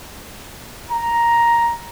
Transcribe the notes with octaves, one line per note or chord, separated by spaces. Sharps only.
A#5